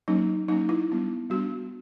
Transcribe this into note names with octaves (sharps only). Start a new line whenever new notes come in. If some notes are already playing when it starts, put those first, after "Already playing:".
F#3 A#3 C#4 D#4
F#3 A#3 C#4 D#4
E4
G3 B3 D4
G3 B3 D4 F#4